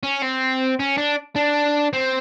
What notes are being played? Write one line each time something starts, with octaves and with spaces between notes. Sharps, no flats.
C#4
C4
C#4
D4
D4
C4